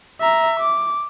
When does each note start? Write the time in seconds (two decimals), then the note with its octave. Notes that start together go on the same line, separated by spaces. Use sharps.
0.21 E5 A#5
0.60 D6